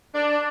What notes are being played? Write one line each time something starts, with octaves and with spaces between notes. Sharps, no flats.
D4